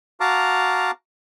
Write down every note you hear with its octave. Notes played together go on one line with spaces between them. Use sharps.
F#4 F5 A5 A#5 D6